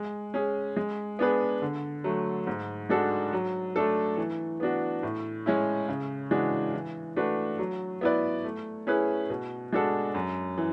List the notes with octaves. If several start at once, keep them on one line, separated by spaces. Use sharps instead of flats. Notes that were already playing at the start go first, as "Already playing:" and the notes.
Already playing: G#3
C#4 G#4
G#3
B3 D4 G#4 B4
D3
F#3 A3
G#2
G#3 D4 F#4 A4
F#3
A3 D4 A4
E3
B3 D4 F#4
A2
G#3 C#4 E4
C#3
E3 G#3 D4 F#4
E3
A3 D4 F#4 B4
F#3
B3 E4 B4 D5
A3
C#4 E4 G#4 B4
B2
G#3 D4 F#4 A4
F#2
E3